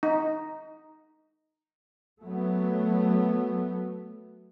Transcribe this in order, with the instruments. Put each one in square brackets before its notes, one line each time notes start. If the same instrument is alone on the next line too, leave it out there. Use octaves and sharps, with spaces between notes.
[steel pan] D#4
[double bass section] F#3 A3 B3